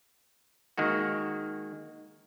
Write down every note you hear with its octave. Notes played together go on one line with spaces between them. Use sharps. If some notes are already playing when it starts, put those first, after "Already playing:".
D#3 G#3 A#3 F#4